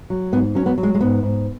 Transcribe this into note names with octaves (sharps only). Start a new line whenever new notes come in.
F#3
G#2 B3
F#3 C#4
B3
F#3
G#3
G#3
G#2 B3
G#2